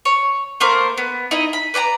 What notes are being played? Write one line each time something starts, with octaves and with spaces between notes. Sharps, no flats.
C#5
A3 A#3 A#4 C5
B3
D#4 E4 D#5
B5
B4 D5 G#5 A#5